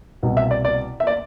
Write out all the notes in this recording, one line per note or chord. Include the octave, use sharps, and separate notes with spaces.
C2 B2
E5
D5
D5
E5
D5